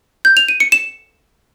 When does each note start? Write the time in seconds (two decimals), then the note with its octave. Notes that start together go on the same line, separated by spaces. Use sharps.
0.25 G6
0.37 F7
0.48 D#7
0.60 C#7
0.72 E7